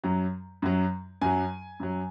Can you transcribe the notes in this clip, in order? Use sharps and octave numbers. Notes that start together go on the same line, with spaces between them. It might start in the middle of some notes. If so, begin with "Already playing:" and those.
F#2 F#3
F#2 F#3
F#2 F#3 G#5
F#2 F#3